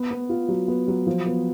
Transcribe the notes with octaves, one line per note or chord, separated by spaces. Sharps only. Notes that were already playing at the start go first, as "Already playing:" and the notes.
Already playing: B3
B3
F4
F#3
B3
F#3
F3
B3